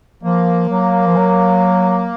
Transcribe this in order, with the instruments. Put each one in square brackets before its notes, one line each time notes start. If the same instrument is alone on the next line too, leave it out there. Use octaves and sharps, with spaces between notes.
[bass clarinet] F3 [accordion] A#3
[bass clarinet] F#3
F3
F#3